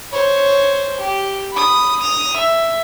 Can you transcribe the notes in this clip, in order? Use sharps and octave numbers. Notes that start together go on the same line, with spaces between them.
C5 C#5
G4
B5 D#6
D#6 F7
E5